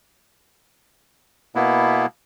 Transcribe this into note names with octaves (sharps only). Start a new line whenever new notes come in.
B2 A#3 B3 E4